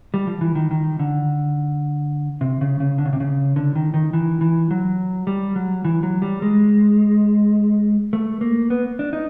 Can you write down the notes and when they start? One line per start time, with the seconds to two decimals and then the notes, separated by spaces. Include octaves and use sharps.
0.14 G3
0.27 F3
0.41 E3
0.55 D#3
0.71 D#3
0.99 D3
2.41 C3
2.61 C#3
2.80 C#3
2.98 D3
3.05 C#3
3.13 C3
3.20 C#3
3.56 D3
3.76 D#3
3.94 D#3
4.13 E3
4.41 E3
4.71 F#3
5.27 G3
5.56 F#3
5.85 E3
6.03 F#3
6.22 G3
6.42 G#3
8.13 A3
8.41 A#3
8.70 B3
8.99 D4
9.13 D#4